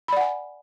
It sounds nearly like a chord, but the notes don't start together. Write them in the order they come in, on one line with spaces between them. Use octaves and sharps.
B5 D5 F#5 G#5